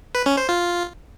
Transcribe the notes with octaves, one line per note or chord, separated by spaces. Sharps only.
B4
C#4
C5
F4